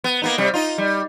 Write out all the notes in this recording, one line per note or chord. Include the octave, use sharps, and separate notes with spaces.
B3
A#3 B3 D#4
C3 G3
D#4 F4
G3